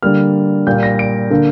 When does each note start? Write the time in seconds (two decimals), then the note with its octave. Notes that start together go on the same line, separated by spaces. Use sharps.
0.03 D3 G3 A#3 F6
0.66 A#2 G3 A#3 G6
0.83 A#6
0.99 D7
1.30 D3 A#3